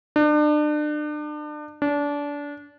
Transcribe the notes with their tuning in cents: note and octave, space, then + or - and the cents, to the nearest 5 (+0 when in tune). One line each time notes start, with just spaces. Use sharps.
D4 +35
D4 -25